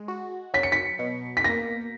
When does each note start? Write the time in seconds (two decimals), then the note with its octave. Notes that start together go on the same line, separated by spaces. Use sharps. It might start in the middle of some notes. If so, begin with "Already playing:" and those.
Already playing: G#3
0.08 F#4
0.54 F#3 B6
0.63 C#7
0.72 B6
0.99 B2
1.37 B6
1.44 A#3 A#6